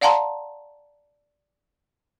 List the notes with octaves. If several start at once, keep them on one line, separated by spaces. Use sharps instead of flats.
D5 F5 F#5 A5 A#5 C6